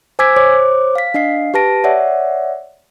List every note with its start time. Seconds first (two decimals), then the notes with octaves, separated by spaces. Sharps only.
0.19 C5 G#5 D6 E6 G#6 B6
0.36 C5 C#5 D6
0.95 F5 B6
1.14 D4 D#5 F5 C7
1.54 G4 B4 A5 A#6 D7
1.84 C#5 D5 E5 F#5